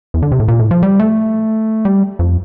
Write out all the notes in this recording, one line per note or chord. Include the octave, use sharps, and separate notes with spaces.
E2
D3
C3
A2
A#2
A2
F3
G3
A3
G3
F2